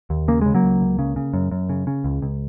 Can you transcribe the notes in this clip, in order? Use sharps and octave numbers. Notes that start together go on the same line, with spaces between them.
D#2
C#3 A#3
C#3 G#3
F#3 A#3
C#2
C#2
C#3
C#3
F#2
F#2
C#3
C#3
C#2
C#2